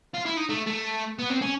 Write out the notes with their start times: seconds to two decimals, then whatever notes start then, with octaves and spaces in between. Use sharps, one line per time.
0.14 F4
0.25 E4
0.37 D#4
0.49 A3
0.66 A3
1.19 B3
1.30 C4
1.41 C#4